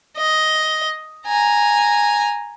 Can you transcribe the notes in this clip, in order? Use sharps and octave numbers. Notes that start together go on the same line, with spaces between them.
D#5
G#5 A#5